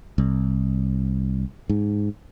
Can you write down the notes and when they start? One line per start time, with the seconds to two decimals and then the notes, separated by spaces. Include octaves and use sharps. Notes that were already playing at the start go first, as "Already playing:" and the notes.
0.18 C2
1.70 G#2